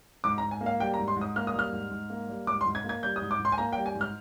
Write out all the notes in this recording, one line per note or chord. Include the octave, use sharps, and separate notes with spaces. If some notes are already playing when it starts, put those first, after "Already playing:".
G#2 D6
A#5
G#2
G#5
A#3
F5
G3 G5
A#5
G#2
C6
G#2 D#6
A#3 F6
D#6
G3 F6
G#2
G#2
A#3
G3
G#2 D6
C6
G#2
G#6
A#3
G#6
G3 G6
D#6
G#2
D6
G#2
C6
G#5
A#3 A#5
G5
G3
G#5
G#2
F6